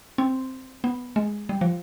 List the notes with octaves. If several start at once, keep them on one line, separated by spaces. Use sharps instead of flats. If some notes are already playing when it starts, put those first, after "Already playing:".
C4
B3
G#3
G3
F3